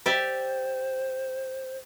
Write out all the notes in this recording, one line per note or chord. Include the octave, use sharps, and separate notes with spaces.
G4 C5 D5 E5